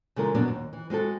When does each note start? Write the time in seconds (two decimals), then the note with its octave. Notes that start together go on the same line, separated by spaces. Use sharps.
0.16 C#3 E3 G#3 F4 A4 A#4
0.35 F#2 B2 F#3 B3 D4
0.48 D#2
0.73 E3
0.90 G#3 C4 F#4 A4